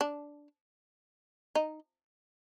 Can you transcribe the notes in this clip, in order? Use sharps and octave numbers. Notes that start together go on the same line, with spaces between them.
D4
D#4